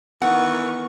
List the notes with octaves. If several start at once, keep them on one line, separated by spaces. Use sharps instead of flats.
D#3 E3 B3 F#5 C#6